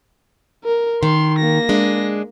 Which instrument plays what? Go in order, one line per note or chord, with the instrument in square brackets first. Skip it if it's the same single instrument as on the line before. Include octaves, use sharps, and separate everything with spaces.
[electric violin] A#4
[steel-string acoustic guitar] D#3 [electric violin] C6
[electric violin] A#3 A#6
[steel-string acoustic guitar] G#3 D4